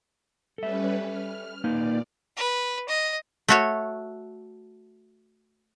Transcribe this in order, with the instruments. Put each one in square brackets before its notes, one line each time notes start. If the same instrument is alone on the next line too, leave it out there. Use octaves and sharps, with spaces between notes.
[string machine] G3 C#4 B4 [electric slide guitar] A4 E5
[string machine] F6
[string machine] A#2 D5 [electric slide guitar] A#3 D#4 B4
[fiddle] B4
D#5
[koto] A3 F#4 C#5